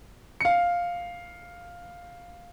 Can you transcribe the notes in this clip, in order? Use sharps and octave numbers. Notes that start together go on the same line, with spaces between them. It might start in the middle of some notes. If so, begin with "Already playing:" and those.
F5 C#7